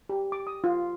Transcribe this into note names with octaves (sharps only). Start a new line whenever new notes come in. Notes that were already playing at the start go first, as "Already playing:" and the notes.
G4
D6
D#6
F4